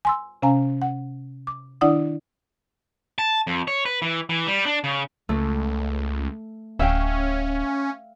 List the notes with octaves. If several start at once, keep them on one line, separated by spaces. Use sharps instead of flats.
G#5 C6 E6
C3 C#4 F5 G#5 A#5
F#5
D6
D#3 D4 E4 D5 F#5 D#6
A5
F2
C#5
B4
E3
E3
G3
D4
C#3
C#2 A3
D1 C#4 E5 F5 G5